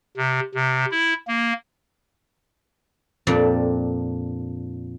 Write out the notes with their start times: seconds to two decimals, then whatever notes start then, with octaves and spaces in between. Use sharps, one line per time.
0.17 C3
0.55 C3
0.92 E4
1.28 A#3
3.27 F2 A#2 D4 D5